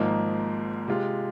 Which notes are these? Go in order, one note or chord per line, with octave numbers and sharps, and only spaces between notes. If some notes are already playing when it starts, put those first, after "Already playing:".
Already playing: G#1 G#2 F3 A#3 D#4
C3 G#3 F4